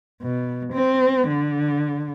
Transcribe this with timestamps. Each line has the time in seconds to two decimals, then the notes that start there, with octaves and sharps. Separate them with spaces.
0.22 B2
0.73 C4
1.28 D3